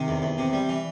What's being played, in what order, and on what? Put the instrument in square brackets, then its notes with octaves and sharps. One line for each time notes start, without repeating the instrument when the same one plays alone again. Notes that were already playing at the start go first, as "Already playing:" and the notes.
Already playing: [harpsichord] C3 [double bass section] D#3
[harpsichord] E2
E2
C3
G3
E3